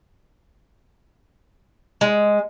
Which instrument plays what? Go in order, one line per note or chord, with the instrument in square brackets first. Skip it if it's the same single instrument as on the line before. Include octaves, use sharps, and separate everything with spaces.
[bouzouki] G#3